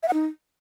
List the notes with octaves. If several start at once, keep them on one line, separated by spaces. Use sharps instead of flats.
E5
F#5
D#4